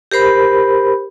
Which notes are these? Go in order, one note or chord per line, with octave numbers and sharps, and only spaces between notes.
G4 A#4 C5 B5